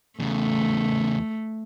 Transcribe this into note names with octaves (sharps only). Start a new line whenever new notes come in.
E2 C#3 A3